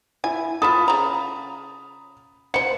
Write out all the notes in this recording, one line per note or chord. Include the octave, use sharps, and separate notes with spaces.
E4 G#5
F4 A4 B5 D#6
C#3 A#5
C5 F#5 C#7